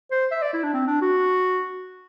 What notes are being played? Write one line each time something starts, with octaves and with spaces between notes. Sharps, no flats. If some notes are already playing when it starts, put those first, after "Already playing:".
C5
E5
D5
E4
D4
C4
D4
F#4